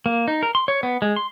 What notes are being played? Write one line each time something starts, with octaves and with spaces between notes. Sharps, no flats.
A#3
D#4
A#4
C6
C#5
B3
G#3
C6